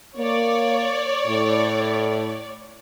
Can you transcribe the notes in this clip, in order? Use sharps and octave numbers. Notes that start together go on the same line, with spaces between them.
A#3 C#5 D5
A2